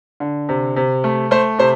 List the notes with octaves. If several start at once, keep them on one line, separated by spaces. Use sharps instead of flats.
D3
C3
C3
A3
A3 C5
C3 C5